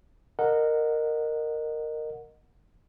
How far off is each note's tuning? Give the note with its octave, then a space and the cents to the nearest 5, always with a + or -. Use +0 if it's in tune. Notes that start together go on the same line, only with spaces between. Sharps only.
A#4 -10 D#5 -20 F#5 -20